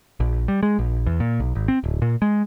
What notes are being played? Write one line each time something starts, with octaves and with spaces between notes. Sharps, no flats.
A#1
G3
G#3
A#1
E2
A#2
B1
G#1
C4
D1
A#2
G#3